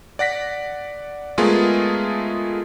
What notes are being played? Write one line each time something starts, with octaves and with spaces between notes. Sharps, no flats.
D5 F#5 A#6 B6
G#3 A3 B3 F4 G#4 A#4